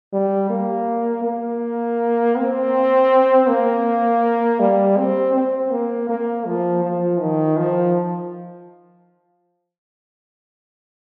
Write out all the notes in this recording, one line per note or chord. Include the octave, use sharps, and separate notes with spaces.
G3
A#3
A#3
C4
A#3
G3
C4
C4
A#3
A#3
F3
F3
D#3
F3